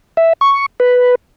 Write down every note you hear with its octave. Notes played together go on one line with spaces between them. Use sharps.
E5
C#6
B4